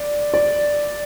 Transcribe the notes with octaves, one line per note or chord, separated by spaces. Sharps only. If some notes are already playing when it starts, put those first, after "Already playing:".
Already playing: D5
D5